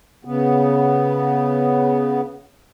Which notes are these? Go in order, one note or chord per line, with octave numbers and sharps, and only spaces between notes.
C#3 B3